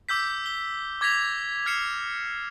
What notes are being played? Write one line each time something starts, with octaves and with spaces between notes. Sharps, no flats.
D6 E6 G6 B6
G7
D6 G#6 A#6 B6 F7
F6 G#6 C7 C#7 E7